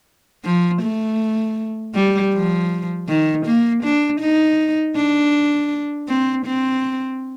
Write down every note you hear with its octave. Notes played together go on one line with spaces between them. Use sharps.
F3
A3
G3
F3
D#3
A#3
D4
D#4
D4
C4
C4